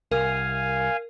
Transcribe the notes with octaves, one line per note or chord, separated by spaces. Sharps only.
C2 A#4 F5 G#5